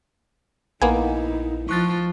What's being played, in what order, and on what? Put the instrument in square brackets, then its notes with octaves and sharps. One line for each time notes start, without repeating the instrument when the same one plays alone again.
[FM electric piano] A#1 [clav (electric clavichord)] A#3 B3 G#5 [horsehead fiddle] D#4 E4
[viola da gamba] F3 [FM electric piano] C#6 F#6 A6